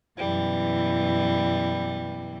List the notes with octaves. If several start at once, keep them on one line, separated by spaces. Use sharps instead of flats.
F#2 B2 E3 G3